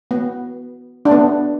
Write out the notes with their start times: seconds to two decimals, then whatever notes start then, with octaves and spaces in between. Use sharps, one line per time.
0.11 B3
1.05 D4
1.11 B3